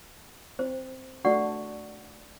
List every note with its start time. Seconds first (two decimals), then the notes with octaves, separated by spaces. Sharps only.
0.59 C4 C5
1.25 A3 D4 F#4 D5 F#5 C#6